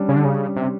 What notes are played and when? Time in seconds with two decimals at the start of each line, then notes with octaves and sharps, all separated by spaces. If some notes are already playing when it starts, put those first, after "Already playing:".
Already playing: G3 C#4 D4
0.09 C#3
0.16 D3
0.25 C#3
0.56 C3